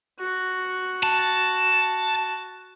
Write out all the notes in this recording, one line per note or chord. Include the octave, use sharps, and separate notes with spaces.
F#4
A5